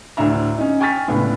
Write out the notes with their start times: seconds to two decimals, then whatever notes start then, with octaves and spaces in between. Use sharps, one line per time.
0.17 D2 A2 D4 E5 A#5
0.58 C#4 D#4
0.80 G5 G#5 C#6 F6 A6 B6
1.08 C#2 A2 B3 D4